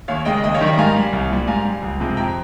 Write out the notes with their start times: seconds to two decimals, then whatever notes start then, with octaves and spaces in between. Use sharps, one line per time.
0.08 D#2 C#5 F5
0.25 C#3 G#3 D#5 G5
0.43 D#2 D#5 G5
0.54 C#5 F5
0.61 D#3 G3
0.66 D#5 G5
0.77 G#2 F5 G#5
0.96 G3
1.13 C2
1.30 A#2 G3
1.47 G#2 F5 G#5
1.65 G3
1.82 C#2
2.00 C3 F3 G#3
2.17 F2 G5 A#5